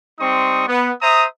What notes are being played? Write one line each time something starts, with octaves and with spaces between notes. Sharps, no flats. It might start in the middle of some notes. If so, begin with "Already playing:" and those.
G3 C4 D#4 C6 C#6 D#6
B3
C5 E5 A#5 D#6